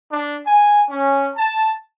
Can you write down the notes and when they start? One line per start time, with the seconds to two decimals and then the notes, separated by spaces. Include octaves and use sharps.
0.11 D4
0.46 G#5
0.89 C#4
1.34 A5